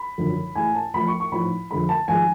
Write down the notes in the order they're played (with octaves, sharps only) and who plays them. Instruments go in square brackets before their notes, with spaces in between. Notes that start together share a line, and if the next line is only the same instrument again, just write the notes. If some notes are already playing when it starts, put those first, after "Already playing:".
Already playing: [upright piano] B5
G#1 F#2 D3 F3
A1 A2 G#3 G#5
A5
A1 A2 F3 B5
C#6
C#6
A1 G#2 F3 B5
F2 D3 G#3 B5
A5
G#1 F3 G#3 G#5